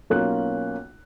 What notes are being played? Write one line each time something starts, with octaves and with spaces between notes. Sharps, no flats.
B1 A#3 C#4 F4 F#6